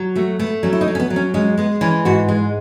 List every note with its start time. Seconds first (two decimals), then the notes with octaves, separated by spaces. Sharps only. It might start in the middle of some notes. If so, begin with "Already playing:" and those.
Already playing: F#3
0.16 A3 F#4
0.39 A3 B3
0.63 F#3 C#4
0.73 E4
0.81 D#4
0.88 F#3
0.95 C#4
1.00 B3
1.10 F#3
1.16 C#4
1.34 G#3 C#4
1.58 G#3 B3
1.81 E3 C#4
2.05 G#2 F#4
2.29 G#3